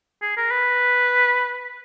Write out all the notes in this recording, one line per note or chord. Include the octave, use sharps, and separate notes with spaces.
G#4
A#4
B4